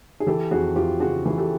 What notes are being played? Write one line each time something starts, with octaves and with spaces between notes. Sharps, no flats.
G#4
E3 G4 A4
F2 F#4 G#4
F2 F4 G4
C#3 F#4 G#4
E3 G#4
G4 A4